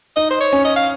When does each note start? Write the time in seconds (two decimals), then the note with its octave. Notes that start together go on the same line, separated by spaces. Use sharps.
0.16 D#4 D#5
0.31 C5
0.41 C#5
0.53 C#4
0.65 D#5
0.76 F5